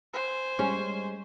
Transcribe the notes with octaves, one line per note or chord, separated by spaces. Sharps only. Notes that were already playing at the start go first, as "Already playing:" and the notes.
C5 G#5
G3 G#3 C#4